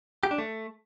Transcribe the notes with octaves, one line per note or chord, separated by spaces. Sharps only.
G4
D4
A3